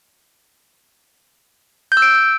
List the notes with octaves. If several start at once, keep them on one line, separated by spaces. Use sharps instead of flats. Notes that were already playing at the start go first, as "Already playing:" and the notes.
G6
E6
D7